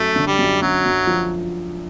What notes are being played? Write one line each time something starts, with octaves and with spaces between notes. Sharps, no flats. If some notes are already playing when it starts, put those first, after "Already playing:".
Already playing: F#2 A3
D3
G3
F#2
F#2 F#3
F#2
F3